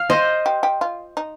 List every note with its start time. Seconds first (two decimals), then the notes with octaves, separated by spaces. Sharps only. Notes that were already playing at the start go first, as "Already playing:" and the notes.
Already playing: F5
0.10 C5 D#5
0.46 G4
0.63 G4
0.81 F4
1.17 D#4